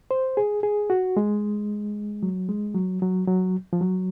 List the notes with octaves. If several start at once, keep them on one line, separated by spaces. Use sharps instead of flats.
C5
G#4
G#4
F#4
G#3
F#3
G#3
F#3
F#3
F#3
F3
F#3